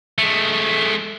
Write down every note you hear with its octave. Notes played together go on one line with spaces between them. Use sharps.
G#3 A3